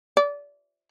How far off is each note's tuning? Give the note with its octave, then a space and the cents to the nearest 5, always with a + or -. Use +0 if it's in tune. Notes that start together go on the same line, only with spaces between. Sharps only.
D5 -25